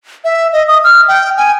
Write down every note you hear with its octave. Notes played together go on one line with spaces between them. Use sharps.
E5
D#5
D#6
F6
G5
G#5